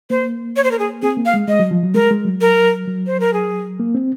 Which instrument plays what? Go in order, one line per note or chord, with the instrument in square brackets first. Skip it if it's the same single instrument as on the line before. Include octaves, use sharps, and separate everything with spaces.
[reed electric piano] A#3 [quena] C5
[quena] C#5
C5
A#4
G#4
[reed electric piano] C4 [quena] G#4
[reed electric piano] A#3
[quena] F5
[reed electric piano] G#3
[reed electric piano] G#3 [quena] D#5
[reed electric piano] F#3
F3
F#3
[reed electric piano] G#3 [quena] A#4
[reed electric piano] G#3
F#3
[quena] A#4
[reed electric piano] F#3
[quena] C5
A#4
G#4
[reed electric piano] A#3
C4